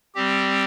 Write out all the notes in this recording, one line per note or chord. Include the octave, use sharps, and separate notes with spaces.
G3 C4 G4